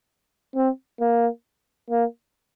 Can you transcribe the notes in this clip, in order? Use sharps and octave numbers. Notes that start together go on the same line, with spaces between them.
C4
A#3
A#3